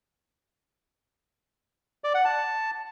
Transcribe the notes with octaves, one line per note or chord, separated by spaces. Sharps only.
D5
F#5
A5